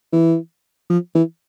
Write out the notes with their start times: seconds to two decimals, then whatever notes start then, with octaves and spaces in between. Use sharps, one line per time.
0.13 E3
0.90 F3
1.15 E3